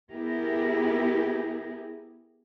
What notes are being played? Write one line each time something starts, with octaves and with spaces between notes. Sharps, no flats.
B3 E4 G4 G#4 A#4